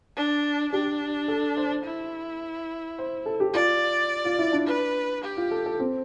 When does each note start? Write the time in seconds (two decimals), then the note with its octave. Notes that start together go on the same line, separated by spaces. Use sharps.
0.16 D4
0.72 D4 G4
1.28 A4
1.57 C5
1.84 E4
2.98 C5
3.26 A4
3.40 G4
3.54 F4 D5
4.25 F4
4.39 E4
4.53 D4
4.67 B4
5.23 G4
5.37 F4
5.51 A4
5.66 A4
5.79 C4